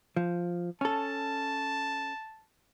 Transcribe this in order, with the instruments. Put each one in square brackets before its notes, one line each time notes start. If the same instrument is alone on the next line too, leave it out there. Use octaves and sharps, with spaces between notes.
[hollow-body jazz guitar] F3
[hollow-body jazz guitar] C#4 A4 [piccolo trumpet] A5